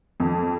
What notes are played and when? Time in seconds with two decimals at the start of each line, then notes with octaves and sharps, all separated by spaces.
0.20 F2